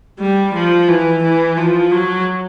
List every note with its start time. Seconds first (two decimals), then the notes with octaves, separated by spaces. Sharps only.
0.19 G3
0.54 F3
0.88 E3
1.23 E3
1.57 F3
1.91 F#3